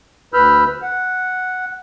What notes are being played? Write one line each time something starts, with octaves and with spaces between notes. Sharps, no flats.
D2 B4 B5 E6 F6 G6
F#5